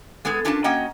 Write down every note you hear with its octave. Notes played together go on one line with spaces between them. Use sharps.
G#3 B3 G#4 A4
C#4 D4 F4 A#4 F#5 A5
A#3 C#4 F#4 D#5 F#5 G5